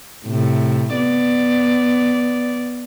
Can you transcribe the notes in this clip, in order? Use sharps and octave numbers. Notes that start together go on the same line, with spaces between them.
A2 C3
B3 D5